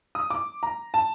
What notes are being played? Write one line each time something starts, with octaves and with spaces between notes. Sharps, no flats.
D#6
D6
A#5
A5